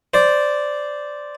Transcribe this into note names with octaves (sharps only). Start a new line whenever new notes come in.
C5 D5